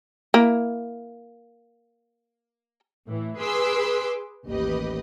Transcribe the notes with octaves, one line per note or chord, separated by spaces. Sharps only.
A#3 E4
A2 E3
G#4 B4 C6 D6 E6
A1 D#2 G4 B4 D#5